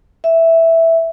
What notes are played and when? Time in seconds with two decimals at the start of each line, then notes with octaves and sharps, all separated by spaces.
0.24 E5